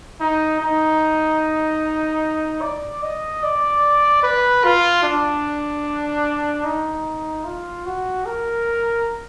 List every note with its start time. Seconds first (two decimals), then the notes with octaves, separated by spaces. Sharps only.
0.20 D#4
0.60 D#4
2.61 D5
3.02 D#5
3.43 D5
4.23 B4
4.64 F4
5.03 D4
6.64 D#4
7.45 F4
7.85 F#4
8.25 A#4